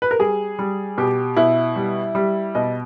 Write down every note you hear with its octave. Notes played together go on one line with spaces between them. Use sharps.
B4
A#4
G3 G#4
G3
B2 G4
B2 E4
G3
G3
B2 D#5